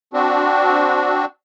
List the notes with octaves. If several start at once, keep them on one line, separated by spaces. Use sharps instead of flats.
C4 D4 F#4